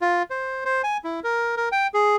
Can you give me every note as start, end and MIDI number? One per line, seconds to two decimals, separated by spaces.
0.02 0.23 65
0.30 0.65 72
0.65 0.82 72
0.84 0.97 80
1.04 1.20 64
1.24 1.56 70
1.57 1.69 70
1.72 1.87 79
1.94 2.16 68